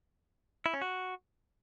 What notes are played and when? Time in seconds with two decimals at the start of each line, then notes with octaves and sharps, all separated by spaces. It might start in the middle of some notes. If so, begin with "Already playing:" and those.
0.66 E4
0.74 C#4
0.82 F#4